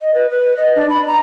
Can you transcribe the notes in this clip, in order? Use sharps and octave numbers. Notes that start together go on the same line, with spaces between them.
D#5
B4
B4
D#5
D4
B5
A#5